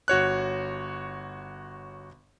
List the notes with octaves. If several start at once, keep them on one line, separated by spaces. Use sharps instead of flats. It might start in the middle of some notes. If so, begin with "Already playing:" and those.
G1 F#4 C#5 F#6